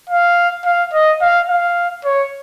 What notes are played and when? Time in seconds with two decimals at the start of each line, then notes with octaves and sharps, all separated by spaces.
0.09 F5
0.65 F5
0.93 D#5
1.22 F5
1.49 F5
2.05 C#5